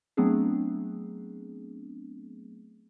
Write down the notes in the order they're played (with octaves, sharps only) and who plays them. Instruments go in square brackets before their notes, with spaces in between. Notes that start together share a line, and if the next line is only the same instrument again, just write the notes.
[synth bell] F#3 A3 B3 C4 D4 G#4